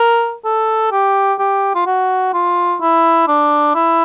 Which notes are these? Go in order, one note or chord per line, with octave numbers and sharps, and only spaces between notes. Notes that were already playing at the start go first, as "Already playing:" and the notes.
Already playing: A#4
A4
G4
G4
F4
F#4
F4
E4
D4
E4